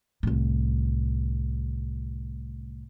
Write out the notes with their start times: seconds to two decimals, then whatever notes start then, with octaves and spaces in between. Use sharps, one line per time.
0.23 C2 A2